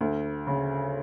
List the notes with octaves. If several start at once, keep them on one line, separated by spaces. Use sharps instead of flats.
D2
C#3